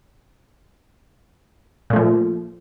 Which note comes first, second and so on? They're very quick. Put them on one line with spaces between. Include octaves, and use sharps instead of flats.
A#2 A3 F3